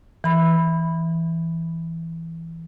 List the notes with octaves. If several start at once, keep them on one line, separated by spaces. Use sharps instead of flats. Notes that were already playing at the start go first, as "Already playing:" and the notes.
E3 B5